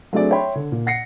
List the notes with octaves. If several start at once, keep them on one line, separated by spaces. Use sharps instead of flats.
F#3 A3 C4 D4 G#4 D5
C#5 E5 G5 B5 C6
D3
A#2
F#5 A#6 C7 C#7